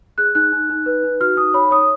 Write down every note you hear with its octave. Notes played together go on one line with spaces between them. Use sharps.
G#4 F#6
D#4 F#6
D#4
D#4
B4
D#4
F#4 F6
D#4 D#6
C#5 B5
C#5 D#6